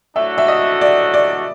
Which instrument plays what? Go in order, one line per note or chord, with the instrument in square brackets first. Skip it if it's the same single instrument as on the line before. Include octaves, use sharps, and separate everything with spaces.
[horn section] A2 F#3 A3 D4 F#4 [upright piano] E5
[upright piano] E5
D#5
D5
D5